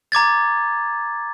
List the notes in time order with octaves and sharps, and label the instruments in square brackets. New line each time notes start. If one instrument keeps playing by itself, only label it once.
[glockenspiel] A#5 D6 G#6 A6